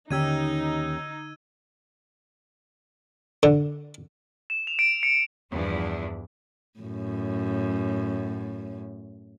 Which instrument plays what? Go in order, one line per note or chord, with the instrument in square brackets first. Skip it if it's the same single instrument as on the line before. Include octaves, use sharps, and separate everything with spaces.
[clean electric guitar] D#2 C#4 G4 [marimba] D3 [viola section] D#4 [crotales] E6 G#6 D#7
[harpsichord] D3
[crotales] E7
F7
D7
C#7
[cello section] E2 G2 F3 D4 E4
[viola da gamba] F#2 A2